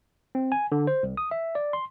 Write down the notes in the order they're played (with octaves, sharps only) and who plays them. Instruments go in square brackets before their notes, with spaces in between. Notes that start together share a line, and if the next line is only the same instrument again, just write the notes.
[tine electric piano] C4
G#5
D3
C5
C2
D#6
E5
D5
C6